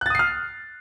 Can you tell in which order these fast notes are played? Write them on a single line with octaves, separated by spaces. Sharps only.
F#6 A6 D#6 C7 F6